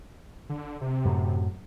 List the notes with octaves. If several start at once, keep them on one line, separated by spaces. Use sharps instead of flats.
D3
C3
F#2 A2